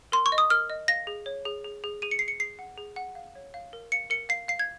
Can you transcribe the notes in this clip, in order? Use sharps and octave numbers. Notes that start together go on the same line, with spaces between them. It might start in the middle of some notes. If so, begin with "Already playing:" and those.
A#4 C6
C#6
D#5
D#6
A#4 F6
D#5
F5 A#6
G#4
C#5
G#4
G#4
G#4
G#4 D#7
C#7
G#4 C7
C#7
G#4 C7
F#5
G#4
F#5
F5
C#5
F5
A#4
F5 C#7
A#4 C#7
F5 C7
F5 C7
G#6